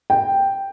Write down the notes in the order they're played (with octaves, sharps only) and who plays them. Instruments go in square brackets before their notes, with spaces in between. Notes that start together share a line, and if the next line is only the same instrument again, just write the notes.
[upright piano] G5